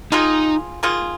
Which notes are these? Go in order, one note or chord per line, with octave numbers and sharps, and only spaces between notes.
D#3 A#3 D#4 F4 G#4
D#3 A#3 F4 G#4